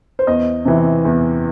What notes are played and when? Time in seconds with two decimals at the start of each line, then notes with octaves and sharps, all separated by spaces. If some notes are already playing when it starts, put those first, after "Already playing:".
0.19 C5
0.27 E2 D#5
0.65 C3 E3
1.05 E2